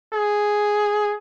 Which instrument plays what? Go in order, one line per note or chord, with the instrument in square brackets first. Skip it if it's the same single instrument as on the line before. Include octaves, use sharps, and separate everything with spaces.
[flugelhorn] G#4